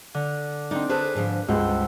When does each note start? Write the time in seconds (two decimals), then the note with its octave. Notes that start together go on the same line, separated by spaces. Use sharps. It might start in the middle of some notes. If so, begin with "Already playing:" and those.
0.14 D3
0.71 C4 D4 D#4
0.89 G#4 A4 B4 C5
1.15 G#2 D3 F3
1.48 C#2 G2 C5 F#5 E6